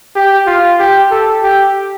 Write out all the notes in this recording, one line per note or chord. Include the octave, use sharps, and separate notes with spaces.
G4
F4
G4
A4
G4